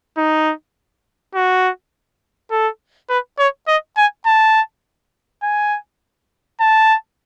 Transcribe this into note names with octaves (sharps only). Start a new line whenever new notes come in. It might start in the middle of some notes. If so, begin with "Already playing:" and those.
D#4
F#4
A4
B4
C#5
D#5
G#5
A5
G#5
A5